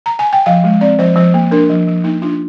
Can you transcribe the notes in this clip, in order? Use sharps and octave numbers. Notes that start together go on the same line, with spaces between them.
A#5
G#5
G5
F3 F5
G#3
C4 D5
F3 C5
F3 C5
A#3
D4 A#4
F3
F3
A#3 D#4
D4 F4